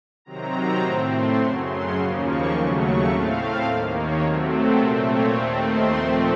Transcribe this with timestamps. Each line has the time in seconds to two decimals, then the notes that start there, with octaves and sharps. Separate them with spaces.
0.25 C3 D#3 F#3 C4 A#5
0.82 A2 A3 C4
1.10 C6
1.38 F#2 C#3 F#3 C#6
1.67 C6
1.94 D#2 C#3 F3 A#3 C#6
2.23 C#6
2.52 D#2 C#3 F#3 A3 C6
2.79 C#6
3.08 A2 A3 C4 F5
3.64 D#2 D#3 A#3
3.93 C#5
4.21 C3 F#3 A3 C4 A#4
4.49 A4
4.78 A#2 A3 C4 A#4
5.06 C#5
5.34 D#2 D#3 A3 C4 F5
5.62 C6
5.90 A#2 F3 A3 C4 C6